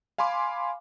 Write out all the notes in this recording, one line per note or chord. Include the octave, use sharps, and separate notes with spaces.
F5 G#5 B5 C6 D6